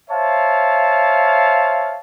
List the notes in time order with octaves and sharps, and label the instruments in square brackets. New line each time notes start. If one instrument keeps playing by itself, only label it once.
[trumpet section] C5 C#5 E5 F5 A5